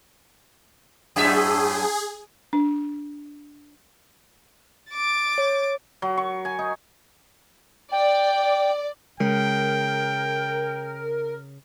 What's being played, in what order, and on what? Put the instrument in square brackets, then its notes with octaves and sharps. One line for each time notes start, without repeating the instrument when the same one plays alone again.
[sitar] F#2 A2 E5 [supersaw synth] G#4
[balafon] D4
[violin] D6 A6
[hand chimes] C#5
[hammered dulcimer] F#3
C#6
G#5
D#4
[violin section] D5 [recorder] G5
[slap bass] C#3 [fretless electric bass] G#3 [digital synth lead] A#4 [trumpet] G5